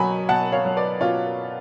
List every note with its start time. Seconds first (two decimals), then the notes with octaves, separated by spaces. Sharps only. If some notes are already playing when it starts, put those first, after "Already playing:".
Already playing: B2 F#3 G#5 B5
0.29 B2 F#5 A5
0.52 C#5 F5
0.65 F#3
0.77 B4 D5
1.00 B2 C#4 F4